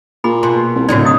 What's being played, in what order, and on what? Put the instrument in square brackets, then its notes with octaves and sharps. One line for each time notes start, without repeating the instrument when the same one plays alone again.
[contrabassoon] A#2 [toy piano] G#4 B5
[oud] B2 [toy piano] C6
[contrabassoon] C2
[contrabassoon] D1 [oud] A2 C#3 D#4 [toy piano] F#4 D5
[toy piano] E4 D#6